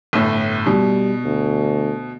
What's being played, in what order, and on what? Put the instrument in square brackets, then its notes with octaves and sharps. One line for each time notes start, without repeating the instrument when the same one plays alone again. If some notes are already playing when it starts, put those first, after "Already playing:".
[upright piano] G1 A2
[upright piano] B2 [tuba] G3
[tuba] D2